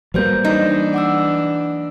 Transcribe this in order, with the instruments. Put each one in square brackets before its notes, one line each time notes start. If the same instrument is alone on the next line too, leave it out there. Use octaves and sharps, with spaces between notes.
[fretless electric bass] F#3 G3 A#3 [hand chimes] B4 C5 G6
[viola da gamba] E3 D4 [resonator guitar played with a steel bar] D#4
[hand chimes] F#5 D6 E6